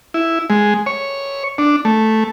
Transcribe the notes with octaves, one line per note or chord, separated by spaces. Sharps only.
E4
G#3
C#5
D4
A3